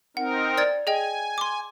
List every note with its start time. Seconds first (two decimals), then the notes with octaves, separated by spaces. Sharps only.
0.17 C4 D#4 A#4 F#5
0.57 D5 G#6 A6
0.87 G#4 D#5 G5 G#5
1.38 C6 D6